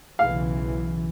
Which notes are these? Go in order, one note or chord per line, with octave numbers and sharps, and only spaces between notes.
B1 C#3 E3 F5